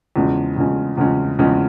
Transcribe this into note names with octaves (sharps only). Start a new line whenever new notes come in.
E2 C#3 F3 G#3 C#4
E2 C#3 F3 G#3 C#4
E2 C#3 F3 G#3 C#4
E2 C#3 F3 G#3 C#4